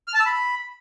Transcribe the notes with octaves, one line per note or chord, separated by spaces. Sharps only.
F6
A5
E6
B5